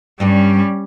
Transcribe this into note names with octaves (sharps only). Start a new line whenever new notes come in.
G2 G3 C#4